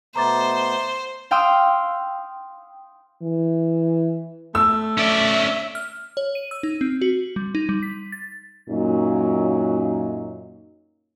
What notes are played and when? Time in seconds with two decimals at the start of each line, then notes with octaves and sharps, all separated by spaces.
0.16 B2 A3 B3 C5 A#5 D6 A6
1.31 F5 G5 C6 D#6 E6
3.22 E3
4.55 A3 E6
4.98 C#4 D5 E5
5.75 F6
6.17 C#5
6.35 D#7
6.51 E6
6.63 D#4
6.81 C4
7.02 F#4
7.36 G3
7.55 D#4
7.69 G3
7.83 B6
8.12 A6
8.69 F#2 A#2 F#3 D#4